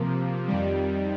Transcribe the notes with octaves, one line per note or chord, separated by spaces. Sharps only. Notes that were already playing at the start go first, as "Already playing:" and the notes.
Already playing: C3 F3 A#3
F2 D#3 G3